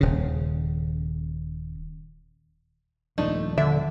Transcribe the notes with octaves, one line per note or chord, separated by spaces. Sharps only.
D#1 C#3
D#1 F3 A3 D4 D#4
D3 E5